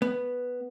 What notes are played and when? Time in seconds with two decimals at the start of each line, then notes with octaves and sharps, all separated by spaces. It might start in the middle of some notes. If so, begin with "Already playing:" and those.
0.02 B3